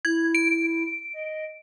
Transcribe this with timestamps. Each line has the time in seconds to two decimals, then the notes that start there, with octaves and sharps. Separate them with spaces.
0.05 E4 G#6
0.35 D7
1.14 D#5